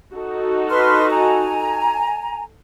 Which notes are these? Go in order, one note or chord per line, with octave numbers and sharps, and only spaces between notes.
D#4 F#4 A4
B4 C6 F6
G#5 A#5